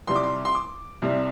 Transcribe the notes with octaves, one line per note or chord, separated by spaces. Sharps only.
C2 C3 G3 C6
D6
C6
C6
D6
C2 C3 G3